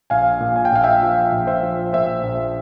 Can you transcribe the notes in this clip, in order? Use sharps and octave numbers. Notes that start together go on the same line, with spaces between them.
A#1 F5 G#5
A#2
G#5
G5
A#1 F5
E5 G5
F3
A#1
C5 E5
F3
A#2 C5 E5
A#1